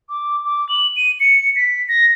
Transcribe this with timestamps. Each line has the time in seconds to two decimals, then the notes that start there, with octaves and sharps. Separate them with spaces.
0.09 D6
0.46 D6
0.69 F#7
0.96 D#7
1.20 C#7
1.56 B6
1.88 A#6